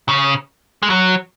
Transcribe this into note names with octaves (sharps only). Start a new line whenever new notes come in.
C#3
G#3
F#3